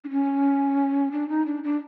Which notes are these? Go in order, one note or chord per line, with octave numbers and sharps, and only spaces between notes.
D4
C#4
D4
D#4
D4
D4